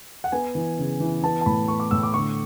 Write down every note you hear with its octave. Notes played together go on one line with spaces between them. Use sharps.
F#5
B3 G#5
E3
C#3
E3
B3 A5
A5
A2 B5
B3 C#6
D6
A2 E6
D6
D3 C#6